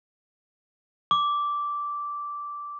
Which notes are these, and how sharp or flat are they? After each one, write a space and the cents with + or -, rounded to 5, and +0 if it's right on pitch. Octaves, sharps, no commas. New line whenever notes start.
D6 -10